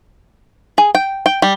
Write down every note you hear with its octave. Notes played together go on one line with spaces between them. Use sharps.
G#4
G5
G5
G3